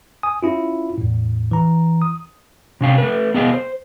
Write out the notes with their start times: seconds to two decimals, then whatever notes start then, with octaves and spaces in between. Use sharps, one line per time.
0.23 G#5 D#6
0.43 C#4 E4 F4
0.98 E2 A2
1.51 E3 A#5
2.02 D#6
2.81 C3 C#4 F5 G5
2.98 A3 B4
3.34 B3 G#4 D#5 F5 G5
3.54 C5